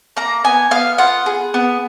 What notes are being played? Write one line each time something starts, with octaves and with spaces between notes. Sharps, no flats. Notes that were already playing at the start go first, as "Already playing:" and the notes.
A#3 A#5
B3 G#5
B3 F5
F4 F#5
G#4
B3